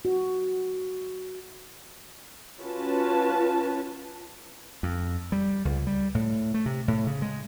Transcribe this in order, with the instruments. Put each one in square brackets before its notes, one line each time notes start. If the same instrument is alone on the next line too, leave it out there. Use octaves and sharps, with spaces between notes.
[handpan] F#4
[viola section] C#4 F4 F#4 B4 A5
[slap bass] F2
G3
C#2
G3
A2
A3
C3
A2
C#3
G#3